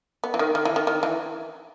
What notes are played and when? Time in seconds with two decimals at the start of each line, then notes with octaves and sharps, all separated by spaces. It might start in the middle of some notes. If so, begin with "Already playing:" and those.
0.24 B3
0.34 E3
0.39 D#3
0.55 D#3
0.65 E3
0.76 D#3
0.87 D#3
1.03 E3